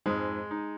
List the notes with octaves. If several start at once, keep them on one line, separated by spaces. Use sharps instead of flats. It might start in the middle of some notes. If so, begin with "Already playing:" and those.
F2 G#2 G#3
D#4